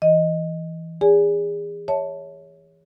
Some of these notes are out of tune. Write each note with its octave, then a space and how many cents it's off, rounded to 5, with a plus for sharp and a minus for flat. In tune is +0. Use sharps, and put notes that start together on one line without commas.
E3 +0 D#5 +0
G#4 -30 D5 -30 G#5 +0
C#5 +10 E5 -25 A5 +0